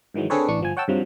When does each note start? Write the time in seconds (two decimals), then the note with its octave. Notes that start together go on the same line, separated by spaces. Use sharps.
0.14 G#2 D#3 E3 F#3 G#3
0.30 D3 C4 G#4 A4 B4 C#5
0.48 A1 E3 D4 C#6
0.60 G1 F3 G#5
0.77 C#5 F#5 G5 A5 E6
0.88 G2 C3 F3 F#3